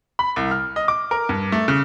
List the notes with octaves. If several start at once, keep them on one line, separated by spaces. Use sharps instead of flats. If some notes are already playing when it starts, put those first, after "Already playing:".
B5
C2
F6
D#5
D6
A#4
G2
A3
C#3